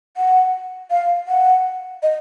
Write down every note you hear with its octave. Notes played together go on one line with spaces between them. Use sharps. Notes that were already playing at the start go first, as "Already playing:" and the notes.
F#5
F5
F#5
D#5